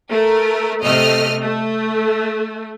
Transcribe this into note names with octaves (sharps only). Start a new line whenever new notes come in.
A3 A#4
C3 A3 D#5 F6
A3